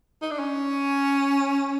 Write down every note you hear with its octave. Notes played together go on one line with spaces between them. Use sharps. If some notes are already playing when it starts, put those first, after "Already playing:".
D#4
D4
C#4